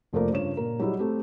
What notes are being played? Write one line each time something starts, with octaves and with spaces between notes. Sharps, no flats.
F1 F2 A3 A#3 A#4 D5
G2 C#3 F4 C#5 E7
A#2 A#4
F#3 G3 D#4 E4 G#4
A3 C4 G4